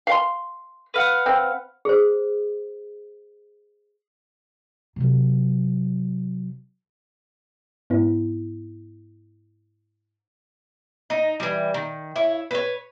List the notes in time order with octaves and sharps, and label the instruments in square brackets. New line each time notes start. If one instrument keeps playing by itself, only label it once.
[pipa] F5 C6
[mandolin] B4 F5 F#5
[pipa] C4
[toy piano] G#4 C5
[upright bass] C3 F#3
[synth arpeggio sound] G#2 B3 E4
[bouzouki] D#4
E3 G3
D#3
E4 C#5
B4 C#5